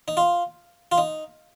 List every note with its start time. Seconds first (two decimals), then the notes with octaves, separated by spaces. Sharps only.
0.08 D#4
0.17 F4
0.92 F4
0.98 D#4